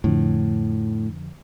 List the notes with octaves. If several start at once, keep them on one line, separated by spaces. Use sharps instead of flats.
F2 A2 D3 F3